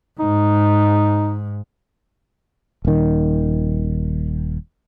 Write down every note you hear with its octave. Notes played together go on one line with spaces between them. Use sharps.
G#2 D#4
D#1 D#3